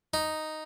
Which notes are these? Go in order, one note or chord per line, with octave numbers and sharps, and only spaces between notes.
D#4